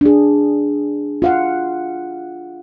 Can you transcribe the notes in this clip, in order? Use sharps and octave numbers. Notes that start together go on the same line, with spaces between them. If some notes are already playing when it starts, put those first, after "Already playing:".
D4 G#4
F4 F5 F#5